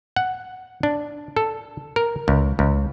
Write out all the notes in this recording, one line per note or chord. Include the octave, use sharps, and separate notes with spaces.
F#5
D4
A4
A#4
C#2
C#2